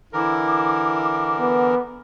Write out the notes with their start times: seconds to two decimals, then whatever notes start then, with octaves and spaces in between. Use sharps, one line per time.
0.13 D3 E3 E4 A#4 D6
1.39 B3